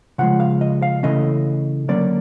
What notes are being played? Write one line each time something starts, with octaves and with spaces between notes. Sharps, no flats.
C#3 F3 G#3 F#5
F5
D#5
F5
C#3 E3 A3 C#4 D#5
D3 F#3 A#3 C#4 D5